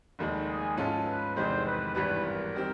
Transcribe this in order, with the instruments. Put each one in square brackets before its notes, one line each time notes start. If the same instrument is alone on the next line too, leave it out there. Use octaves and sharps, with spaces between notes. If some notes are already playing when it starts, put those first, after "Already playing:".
[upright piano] F1 D#2 D#3 G#3
[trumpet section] G#4
[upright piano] G#2 F3 G#3 C#4 F4 [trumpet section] A4
[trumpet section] B4
[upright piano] F1 E2 C3 D#3 G#3 [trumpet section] C5
[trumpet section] B4
[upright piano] G#1 G2 E3 G3 B3 [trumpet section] B4
[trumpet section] A#4
[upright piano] D#3 G3 C4